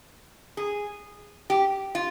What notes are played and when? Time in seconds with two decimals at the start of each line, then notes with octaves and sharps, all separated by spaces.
0.57 G#4
1.50 G4
1.95 F4